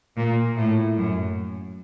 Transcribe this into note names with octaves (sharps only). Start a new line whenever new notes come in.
A#2
A2
F#2